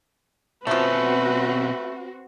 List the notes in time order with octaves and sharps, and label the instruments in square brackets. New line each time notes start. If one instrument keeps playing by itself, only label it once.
[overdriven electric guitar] B2 C#4 [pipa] F3 A3 [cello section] C4 F#4 [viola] B4